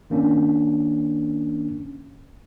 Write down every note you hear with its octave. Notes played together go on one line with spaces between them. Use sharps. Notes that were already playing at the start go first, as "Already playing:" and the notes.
D#3 A#3 C#4 D4